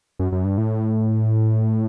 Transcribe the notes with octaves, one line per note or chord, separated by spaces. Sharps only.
F#2
F#2
G2
A2